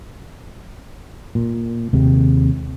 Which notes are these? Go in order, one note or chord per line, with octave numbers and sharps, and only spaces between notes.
A#2
D#2 C3 G#3